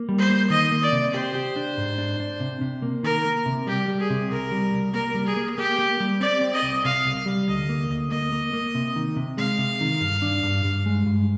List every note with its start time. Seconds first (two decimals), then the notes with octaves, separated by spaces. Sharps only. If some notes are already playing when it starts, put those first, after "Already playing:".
Already playing: A#3
0.09 G3
0.18 C5
0.30 A#3
0.50 D#3 D#5
0.72 A#3
0.83 D5
0.92 C3
1.14 G4 C5
1.35 G4
1.56 D4
1.78 G#2
1.98 D4
2.20 D4
2.40 C3
2.61 C3
2.82 A#3
3.03 D#3 A#4
3.25 A#3
3.46 C3
3.67 G3 G4
3.88 G3
4.00 G#4
4.10 C3
4.31 C2 A#4
4.51 G3
4.73 C2
4.93 A#3 A#4
5.15 G3
5.26 G#4
5.36 A#3
5.57 A#3 G4
5.79 A#3
6.00 G3
6.20 C4 D5
6.41 C4
6.53 D#5
6.62 C2
6.85 C3 F5
7.05 C2
7.26 G3
7.48 D2 D#5
7.69 A#3
7.89 D2
8.11 A#3 D#5
8.32 A#3
8.53 A#3
8.75 C3
8.96 D#3
9.16 C3
9.37 G#3 F5
9.58 C3
9.80 D#3
10.01 G2
10.22 D4
10.43 G2
10.65 G2
10.86 G#3
11.06 G2